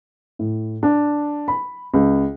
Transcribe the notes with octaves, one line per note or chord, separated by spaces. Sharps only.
A2
D4
B5
C#2